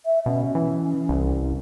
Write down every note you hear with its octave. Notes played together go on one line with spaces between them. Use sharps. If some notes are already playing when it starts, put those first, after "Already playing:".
E5
B2 C#4
E3
C2